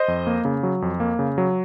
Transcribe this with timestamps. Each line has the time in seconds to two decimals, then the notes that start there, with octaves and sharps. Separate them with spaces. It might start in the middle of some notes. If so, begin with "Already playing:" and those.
Already playing: C5 D#5
0.08 F2
0.27 A#3
0.45 C#3
0.63 F#3
0.82 F2
1.00 A#3
1.19 C#3
1.38 F#3